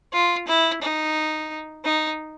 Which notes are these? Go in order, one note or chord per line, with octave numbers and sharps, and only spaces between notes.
F4
E4
D#4
D#4